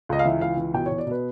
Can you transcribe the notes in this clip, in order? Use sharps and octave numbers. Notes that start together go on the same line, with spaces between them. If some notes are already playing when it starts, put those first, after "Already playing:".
C#2 D#5
F5
E3 E5
C#2 F5
E3
B2 G5
C#5
B2
D5
B2 B4